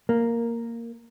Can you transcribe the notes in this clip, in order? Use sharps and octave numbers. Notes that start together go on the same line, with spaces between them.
A#3